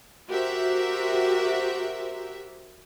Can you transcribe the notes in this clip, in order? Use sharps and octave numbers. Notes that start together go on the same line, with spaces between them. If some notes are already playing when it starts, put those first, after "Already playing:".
F#4 G4 A#4 C5 E5